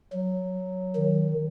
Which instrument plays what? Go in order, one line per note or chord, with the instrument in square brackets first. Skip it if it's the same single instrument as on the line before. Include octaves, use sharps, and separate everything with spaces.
[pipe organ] F#3
D#3